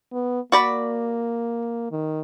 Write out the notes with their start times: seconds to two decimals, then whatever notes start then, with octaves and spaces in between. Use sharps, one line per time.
0.12 B3
0.52 A#3 F#4 D5 B5
1.91 D#3